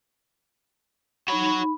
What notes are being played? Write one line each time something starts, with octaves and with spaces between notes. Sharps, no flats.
D#4 F#4 C#5 B5